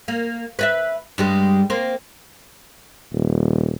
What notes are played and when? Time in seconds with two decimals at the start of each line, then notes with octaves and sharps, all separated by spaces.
0.08 A#3
0.59 B4 D#5 E5
1.18 G2 G3 G#3
1.70 A#3 C4
3.13 D#1